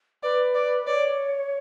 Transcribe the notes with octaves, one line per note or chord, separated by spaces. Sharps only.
B4 D5
D5
C#5 D5